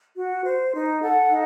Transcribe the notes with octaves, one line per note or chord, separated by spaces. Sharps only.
F#4
C5
D#4
A4 F#5
D#4